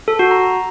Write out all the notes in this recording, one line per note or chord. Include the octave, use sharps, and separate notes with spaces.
A4
F#4
A#5